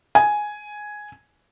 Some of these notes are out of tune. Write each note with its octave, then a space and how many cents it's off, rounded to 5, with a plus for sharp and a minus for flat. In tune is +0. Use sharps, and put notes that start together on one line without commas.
G#5 +5